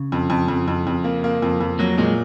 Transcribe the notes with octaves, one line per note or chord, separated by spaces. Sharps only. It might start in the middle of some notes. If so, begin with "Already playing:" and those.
Already playing: C#3
F2
F2
F2
F2
F2
A#3
A#3
F2
F2
F#3 A#3
A#2 G#3